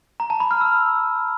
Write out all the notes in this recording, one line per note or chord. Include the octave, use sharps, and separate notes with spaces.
A#5
A5
B5
F6
E6